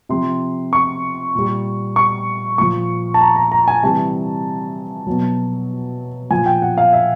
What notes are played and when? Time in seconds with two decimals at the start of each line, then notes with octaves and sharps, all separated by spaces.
0.09 C3 F3 C6
0.73 C#6
1.35 A#2 G3
1.96 C#6
2.58 A#2 F3 C#6
3.14 A5
3.21 A#5
3.36 A#5
3.52 A#5
3.68 G#5
3.83 C3 E3 G3 A5
5.07 B2 F#3
6.31 A#2 F3 G#5
6.46 G5
6.62 F#5
6.78 F5
6.93 E5